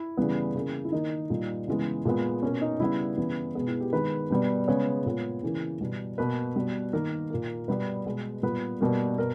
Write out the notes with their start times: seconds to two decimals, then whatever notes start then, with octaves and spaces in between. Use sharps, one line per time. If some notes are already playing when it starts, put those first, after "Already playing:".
Already playing: E4
0.17 C#3 E3 G3 B3
0.55 C#3 E3 A#3
0.85 E4
0.92 D#3 A#3 D#4
1.30 A#2 G3 A#3
1.68 C#3 E3 G#3 B3
2.05 A#2 G#3 B3
2.42 B2 A#3 C#4
2.61 D#4
2.80 C#3 G3 B3 E4
3.17 C#3 E3 G3 B3
3.55 B2 G#3 B3 G#4
3.68 E4
3.80 G4
3.93 D#3 G#3 B3 B4
4.30 B2 G3 B3
4.68 C#3 G#3 B3 C#5
5.06 A#2 G#3 B3
5.43 C#3 E3 A#3
5.81 B2 G3 B3
6.18 B2 A#3 B4
6.56 B2 G3 B3
6.93 D#3 A#3 A#4
7.30 A#2 A#3
7.68 B2 G3 B3 B4
8.06 B2 G#3 B3
8.43 A#2 G3 B3 B4
8.80 B2 G3 A#3
9.18 B2 A#4